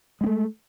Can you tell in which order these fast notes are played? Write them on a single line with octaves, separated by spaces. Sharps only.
G#3 C#4 A3